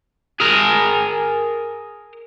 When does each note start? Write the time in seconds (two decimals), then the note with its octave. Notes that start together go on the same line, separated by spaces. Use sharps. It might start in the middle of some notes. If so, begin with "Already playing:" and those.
0.40 G#4 A#4